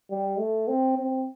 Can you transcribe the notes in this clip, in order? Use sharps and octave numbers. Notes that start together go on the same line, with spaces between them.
G3
A3
C4
C4